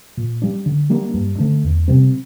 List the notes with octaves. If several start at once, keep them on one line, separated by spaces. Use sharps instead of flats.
A#2
G3 D4
D3
G3 A#3 D4
G2
D3 A3 D4
E2
C3 G3 C4